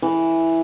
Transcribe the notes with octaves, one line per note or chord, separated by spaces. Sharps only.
E3